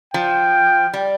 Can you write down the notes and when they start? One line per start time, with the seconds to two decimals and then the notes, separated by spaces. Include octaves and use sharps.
0.14 F3 G5
0.94 G3